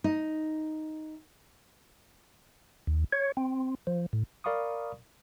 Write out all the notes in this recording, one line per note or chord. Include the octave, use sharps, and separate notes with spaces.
D#4
D#2
C#5
C4
F3
A2
A#4 D5 F5 B5 C#6 D#6